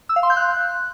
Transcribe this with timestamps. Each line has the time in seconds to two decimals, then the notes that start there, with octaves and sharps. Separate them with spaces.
0.09 E6
0.16 F5
0.23 C6
0.30 G6
0.37 F#6